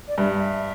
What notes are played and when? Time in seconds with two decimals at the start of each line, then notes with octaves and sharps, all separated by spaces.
0.08 D5
0.18 G2 E5
0.38 E5